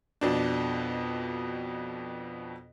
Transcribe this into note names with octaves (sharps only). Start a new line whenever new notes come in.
F2 B2 D4